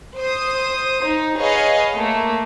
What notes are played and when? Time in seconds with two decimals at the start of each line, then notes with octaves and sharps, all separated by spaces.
0.16 C5 D#6
1.05 D#4
1.37 G#4 B4 C#5 D#5 F5
1.93 A3 A#3